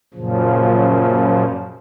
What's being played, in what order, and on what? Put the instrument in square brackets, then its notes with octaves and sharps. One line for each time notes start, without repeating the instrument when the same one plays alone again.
[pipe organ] F#2 A#2 C#3 F3